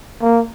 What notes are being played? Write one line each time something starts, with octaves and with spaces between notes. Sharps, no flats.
A#3